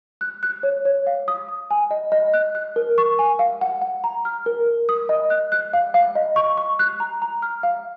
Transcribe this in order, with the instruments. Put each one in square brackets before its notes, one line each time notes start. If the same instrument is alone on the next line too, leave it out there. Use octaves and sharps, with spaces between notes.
[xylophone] F#6
F#6
C#5
C#5
F5
D#6
D#6
G#5
D#5
D#5
F#6
F#6
A#4
C#6
G#5
F5
F#5
F#5
A#5
F6
A#4
A#4
D#6
D#5
F#6
F#6
F5
F5
D#5
C#6
C#6
F#6
A#5
A#5
F6
F5